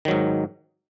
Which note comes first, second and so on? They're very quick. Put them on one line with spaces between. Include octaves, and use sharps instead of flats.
D#3 F#3 G#2